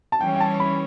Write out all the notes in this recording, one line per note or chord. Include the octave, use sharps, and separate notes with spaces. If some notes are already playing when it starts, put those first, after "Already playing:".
A5
E3 G3 C#4 G5
G5
A5
B5